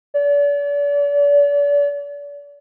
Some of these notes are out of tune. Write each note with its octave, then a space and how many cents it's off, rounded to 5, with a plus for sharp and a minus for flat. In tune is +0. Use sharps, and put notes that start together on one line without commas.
D5 -40